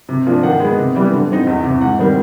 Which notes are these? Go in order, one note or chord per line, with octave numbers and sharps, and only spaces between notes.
C3
F3 A#3 D4
D#3 F#5
G#3 B3
C3
E3 G3 B3
D3
G3 C4 D#4
E2
C3 E3
G#2 F#5
D#3 G3 C4